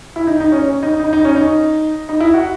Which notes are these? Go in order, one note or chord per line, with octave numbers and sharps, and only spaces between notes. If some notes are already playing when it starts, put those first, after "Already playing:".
E4
D#4
D#4
C#4
C#4
D#4
D#4
D#4
C#4
D#4
D#4
E4
F#4